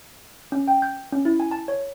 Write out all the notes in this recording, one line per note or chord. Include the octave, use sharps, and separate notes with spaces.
C#4
G5
G6
C#4
E4
G#5
A5
C#5